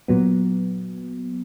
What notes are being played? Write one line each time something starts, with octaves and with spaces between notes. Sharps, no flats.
A#2 F#3 B3